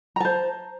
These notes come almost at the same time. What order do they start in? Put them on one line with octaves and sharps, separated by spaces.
A#5 A5 C5